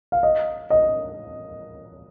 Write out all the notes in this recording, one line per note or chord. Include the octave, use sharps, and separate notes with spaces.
F5
D#5
D#5